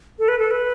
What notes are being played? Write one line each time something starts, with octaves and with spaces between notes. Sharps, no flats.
A4
B4
A4
B4